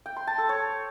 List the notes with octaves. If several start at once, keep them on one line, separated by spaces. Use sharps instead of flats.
G5
C6
A5
A4
C#5